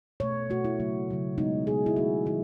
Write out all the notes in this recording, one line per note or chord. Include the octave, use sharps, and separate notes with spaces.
B2 A3 C#5
B2 A3 F#4
E4
C#3 F#3 A3
C#3 F#3 A3
B2 G#3 B3 D#4
B2 G#3 B3 G#4
E4
D#3 F#3 A3 F#4
D#3 F#3 E4